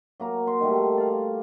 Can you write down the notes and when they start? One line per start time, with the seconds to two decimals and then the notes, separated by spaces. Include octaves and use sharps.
0.20 F#3 A#3 A#5
0.47 C6
0.60 D#3 G3 A3
0.97 D5 F5